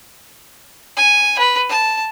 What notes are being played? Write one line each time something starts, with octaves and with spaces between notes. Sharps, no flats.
G#5
B4
A5